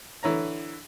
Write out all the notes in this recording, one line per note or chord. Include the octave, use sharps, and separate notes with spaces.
D3 E3 C#5 A#5